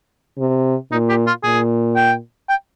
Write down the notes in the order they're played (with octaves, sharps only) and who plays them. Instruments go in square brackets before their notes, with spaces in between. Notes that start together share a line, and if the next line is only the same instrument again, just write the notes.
[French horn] C3
[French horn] A#2 [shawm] D#4
[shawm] G4
F4
[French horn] A#2 [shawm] G#4
[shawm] G5
G5